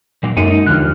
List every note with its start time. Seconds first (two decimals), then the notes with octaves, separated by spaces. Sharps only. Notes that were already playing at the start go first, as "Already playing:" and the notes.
0.23 A#2 F#3 A#3
0.37 F#2 G#3 A#3 D#4 A4 D#7
0.51 D#4
0.66 D#2 D3 E3 F3 F6 F#6